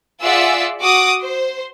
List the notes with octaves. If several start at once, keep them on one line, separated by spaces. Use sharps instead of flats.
F4 G#4 D5 E5 F#5 E6
F#4 D6 D#6
C5